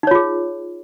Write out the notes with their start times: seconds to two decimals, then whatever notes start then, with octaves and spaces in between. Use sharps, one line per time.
0.03 D#4
0.07 C#5
0.11 F4
0.15 G#4